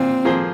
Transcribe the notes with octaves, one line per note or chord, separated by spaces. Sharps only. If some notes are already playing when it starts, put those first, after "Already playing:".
Already playing: A#2 C4
F3 A#3 G#4 C5